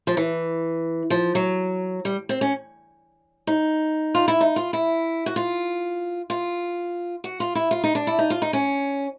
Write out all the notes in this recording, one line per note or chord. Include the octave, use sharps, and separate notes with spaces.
F3
E3
F3
F#3
G3
C4
C#4
D#4
F4
E4
D#4
F4
E4
F#4
F4
F4
F#4
F4
E4
F4
D#4
D4
E4
D#4
F4
D#4
C#4